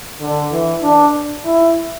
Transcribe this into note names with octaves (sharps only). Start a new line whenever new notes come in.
D3
E3
D4
E4